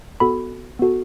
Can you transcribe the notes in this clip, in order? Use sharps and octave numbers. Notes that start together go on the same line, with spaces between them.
B3 F#4 A4 B5
B3 F#4 A4